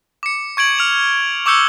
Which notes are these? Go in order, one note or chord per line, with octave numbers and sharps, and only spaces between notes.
D6 C#7
C#6 G#6 D7 F#7
F6 F7
C#6 D6 E6 G6 C#7 G7